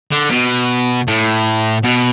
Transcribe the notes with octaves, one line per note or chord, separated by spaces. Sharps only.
D3
B2
A2
B2